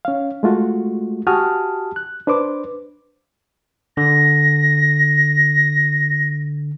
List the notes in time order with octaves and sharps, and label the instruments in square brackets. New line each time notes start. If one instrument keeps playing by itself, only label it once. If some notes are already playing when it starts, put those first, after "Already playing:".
[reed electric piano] C#4 F5
G#3 A3 F4 F#4
F#4 G4 G#5 A5 D#6 F6
F#6
D4 B4 C5 D6
[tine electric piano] D3 [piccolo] A#6